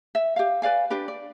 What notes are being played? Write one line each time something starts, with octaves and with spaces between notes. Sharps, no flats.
E5
G4 F5
B4 D5 F5 G#5
D4 G4 B4
D5